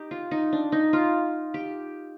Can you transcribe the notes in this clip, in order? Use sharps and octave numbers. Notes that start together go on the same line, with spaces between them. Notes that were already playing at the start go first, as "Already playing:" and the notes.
Already playing: D#4 G4
F4
D#4
D4
D#4
F4
G4